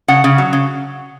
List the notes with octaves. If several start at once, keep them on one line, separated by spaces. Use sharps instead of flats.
C#3 F#5
C#3
F#3
C#3